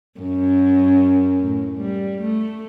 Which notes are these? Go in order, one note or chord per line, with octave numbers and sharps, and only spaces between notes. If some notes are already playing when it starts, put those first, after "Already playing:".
F#2
A2
G3
A3